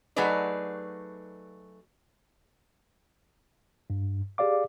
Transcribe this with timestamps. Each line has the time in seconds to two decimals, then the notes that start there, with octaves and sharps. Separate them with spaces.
0.16 F#3 A3 D#4 G#4 B4 D5
3.90 G2
4.38 G4 G#4 D5 F5 D6